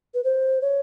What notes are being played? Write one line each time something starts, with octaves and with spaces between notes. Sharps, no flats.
B4
C5
C#5